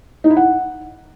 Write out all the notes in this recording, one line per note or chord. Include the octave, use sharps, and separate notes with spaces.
D#4
E4
F#5